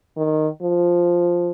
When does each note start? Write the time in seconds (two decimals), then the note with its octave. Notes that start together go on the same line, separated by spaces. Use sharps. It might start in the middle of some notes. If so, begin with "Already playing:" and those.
0.17 D#3
0.62 F3